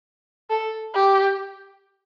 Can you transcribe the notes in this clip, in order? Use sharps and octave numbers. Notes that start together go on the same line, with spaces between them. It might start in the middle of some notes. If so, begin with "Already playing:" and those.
A4
G4